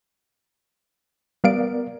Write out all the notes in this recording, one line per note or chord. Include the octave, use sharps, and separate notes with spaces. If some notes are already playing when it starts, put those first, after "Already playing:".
G3 B3 A#4 D5 F5 D7